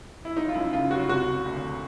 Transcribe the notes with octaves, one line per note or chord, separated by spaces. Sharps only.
E4
F#1 D#4
F4
F#2 E4
C#3 F4
F#1 F#4
C3 F#4
C3
D2